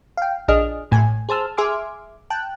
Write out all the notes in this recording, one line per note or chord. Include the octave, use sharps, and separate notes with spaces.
F5 G5
A#1 D4 G#4 D#5 F6
A1 A2 G#5
G#4 C5 A5 E6 F6
G#4 E5 G#5 C6 D6 F6
G5 A5 F#6